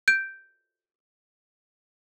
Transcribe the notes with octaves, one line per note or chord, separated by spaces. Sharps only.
G6 D7